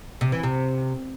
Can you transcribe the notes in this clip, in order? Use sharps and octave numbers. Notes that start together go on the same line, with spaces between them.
C3
E3
C3